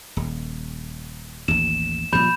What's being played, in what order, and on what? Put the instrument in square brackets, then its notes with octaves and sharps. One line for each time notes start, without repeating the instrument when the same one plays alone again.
[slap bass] D#1
[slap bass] A1 D#2 [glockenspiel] E7
[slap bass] A#2 F3 G3 [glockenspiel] B5 G6 E7